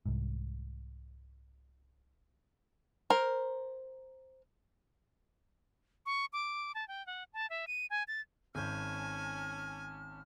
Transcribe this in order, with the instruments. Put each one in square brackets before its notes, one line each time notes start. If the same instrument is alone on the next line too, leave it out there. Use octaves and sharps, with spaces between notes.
[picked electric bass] C2 G#2
[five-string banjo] A#4 C5
[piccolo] C#6
D6
A5
G5
F#5
A5
E5
D#7
G#5
A6
[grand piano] G#1 G6 [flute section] C#4 A5 F6 [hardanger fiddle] G#5